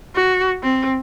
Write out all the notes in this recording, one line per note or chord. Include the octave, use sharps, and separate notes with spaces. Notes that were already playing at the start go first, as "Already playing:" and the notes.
F#4
C4